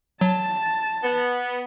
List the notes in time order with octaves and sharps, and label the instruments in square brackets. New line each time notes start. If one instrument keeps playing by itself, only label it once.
[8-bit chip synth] F#3 [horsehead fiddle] A5
[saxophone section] B3